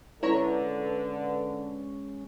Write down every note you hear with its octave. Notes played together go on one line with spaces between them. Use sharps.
D3 G#3 C#4 E4 B4 C#5 A#5